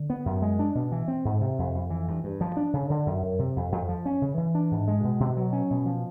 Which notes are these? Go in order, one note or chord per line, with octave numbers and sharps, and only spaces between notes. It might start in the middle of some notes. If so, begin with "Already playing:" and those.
Already playing: D3
B3
F#2
G#3
D4
B2
E3
C4
G#2
C3
F2
F2
E3
G2
G2
F3
D4
C#3
D3
F#2
F#2
C3
F2
F2
F3
C#4
C#3
E3
D4
G#2
G#3
B2
B2
F#3
C#4
B2
F3